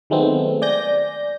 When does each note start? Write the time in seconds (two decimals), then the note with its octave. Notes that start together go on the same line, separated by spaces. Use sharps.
0.10 D#3 F#3 G#3 A3 B3 C4
0.62 D5 G#5 G6 A#6